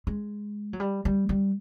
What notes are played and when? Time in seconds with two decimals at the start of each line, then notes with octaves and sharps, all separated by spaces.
0.07 G#3
0.73 F#3
0.80 G3
1.05 G3
1.29 G3